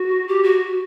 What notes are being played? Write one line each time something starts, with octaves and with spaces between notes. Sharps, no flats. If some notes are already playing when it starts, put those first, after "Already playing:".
Already playing: F#4
G4
F#4